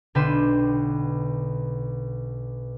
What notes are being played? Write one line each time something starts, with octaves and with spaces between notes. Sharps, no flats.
B1 D3 B4 G5 C6 E7